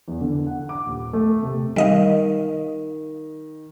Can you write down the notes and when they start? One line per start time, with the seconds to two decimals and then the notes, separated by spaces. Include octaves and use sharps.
0.08 E2
0.21 D3
0.46 F#5
0.69 D6
0.86 D#1
1.13 A3
1.43 C3
1.76 D#3 G3 D#5 F5